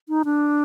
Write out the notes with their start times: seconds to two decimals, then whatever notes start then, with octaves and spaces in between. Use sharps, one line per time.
0.09 D#4
0.25 D4